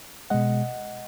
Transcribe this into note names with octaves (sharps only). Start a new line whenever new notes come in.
B2 G#3 D#5 F#5